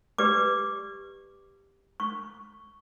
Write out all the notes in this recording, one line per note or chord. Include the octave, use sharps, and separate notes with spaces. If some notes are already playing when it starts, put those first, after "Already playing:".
G4 B4 D5 D6
C#6